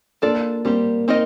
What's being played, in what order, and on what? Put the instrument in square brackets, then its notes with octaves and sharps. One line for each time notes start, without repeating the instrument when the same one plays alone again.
[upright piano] A#3 [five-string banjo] D4 F4 A4 D5
[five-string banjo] G3 C4 G4 [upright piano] A#3
[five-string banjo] C4 D#4 A#4 D#5